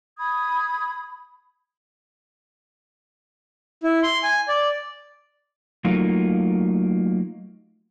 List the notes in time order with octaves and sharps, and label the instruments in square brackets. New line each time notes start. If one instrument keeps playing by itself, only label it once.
[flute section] B5 D#6 G#6
[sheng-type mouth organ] E4
C6
G#5
D5
[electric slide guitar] F#3 A3 A#3 D#4 F4